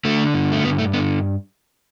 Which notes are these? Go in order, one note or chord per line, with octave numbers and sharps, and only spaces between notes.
D3 A3
G2
A3
G2 B3
A3
D3 B3